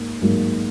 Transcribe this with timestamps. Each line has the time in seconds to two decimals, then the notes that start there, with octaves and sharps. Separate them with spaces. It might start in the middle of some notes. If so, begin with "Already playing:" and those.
Already playing: G#2 A#3
0.22 G#2 F#3 A#3